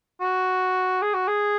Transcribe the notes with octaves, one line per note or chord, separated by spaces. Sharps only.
F#4
G#4
F#4
G#4